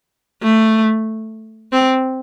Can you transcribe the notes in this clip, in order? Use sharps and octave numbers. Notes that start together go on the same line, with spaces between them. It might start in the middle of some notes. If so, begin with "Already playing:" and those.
A3
C4